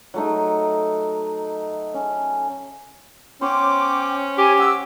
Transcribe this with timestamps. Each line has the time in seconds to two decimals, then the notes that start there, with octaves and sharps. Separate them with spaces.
0.14 F#3 A3 D#4
1.94 C#4
3.41 B3 C#4 C5 C#5 G5 D6
4.38 G4 G#5
4.58 F#5 C#6 E6